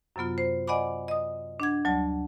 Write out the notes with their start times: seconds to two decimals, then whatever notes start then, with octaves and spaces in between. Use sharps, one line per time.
0.16 F#2 C3 F#3 B3 F4
0.38 C5
0.68 D5 D#5 F#5 G#5 B5 D6
1.08 D#5 D#6
1.60 D4 F#5 G#6
1.85 D2 F#3 G3 D5 A5